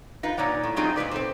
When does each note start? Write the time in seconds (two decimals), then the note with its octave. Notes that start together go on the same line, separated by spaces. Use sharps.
0.23 D#4 F4 B4
0.37 A#2 D#4 C#5 D5 F#5
0.63 A2
0.76 F#3 G#3 C4 D#4 F4 G#4
0.96 A#2 C#3 B4 D5
1.11 C4 A4 C5